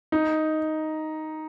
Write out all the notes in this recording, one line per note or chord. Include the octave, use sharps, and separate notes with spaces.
D#4